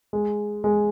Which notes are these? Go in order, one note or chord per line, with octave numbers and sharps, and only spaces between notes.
G#3
G#3